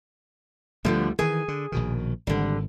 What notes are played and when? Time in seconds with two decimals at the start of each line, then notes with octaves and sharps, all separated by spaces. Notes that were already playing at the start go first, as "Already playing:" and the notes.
0.85 D2 D3 F3 G3 A3 B3
1.19 D#3 E3 G#4 G#5
1.48 D3
1.72 A#1 B2 D#3
2.27 G#1 D3 G3